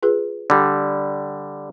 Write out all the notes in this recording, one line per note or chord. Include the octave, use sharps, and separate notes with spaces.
F4 G#4 B4
D3 G3